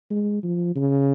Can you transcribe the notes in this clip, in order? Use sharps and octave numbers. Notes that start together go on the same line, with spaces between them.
G#3
F3
C#3